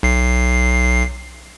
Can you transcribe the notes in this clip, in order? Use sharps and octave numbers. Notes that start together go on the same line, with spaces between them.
B1 C7